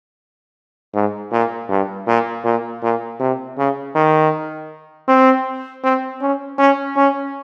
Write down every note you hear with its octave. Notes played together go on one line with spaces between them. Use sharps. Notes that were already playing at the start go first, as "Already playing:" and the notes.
G#2
A#2
G2
A#2
A#2
A#2
C3
C#3
D#3
C4
C4
C#4
C#4
C#4